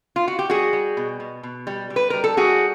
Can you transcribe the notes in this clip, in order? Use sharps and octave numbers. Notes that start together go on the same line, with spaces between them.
F4
F#4
G4
G3 F#4 G#4
G3
B2
B2
B2
G3
G3
B4
G3 A#4
A4
G3 F#4 G#4